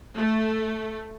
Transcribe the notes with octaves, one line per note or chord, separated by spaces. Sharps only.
A3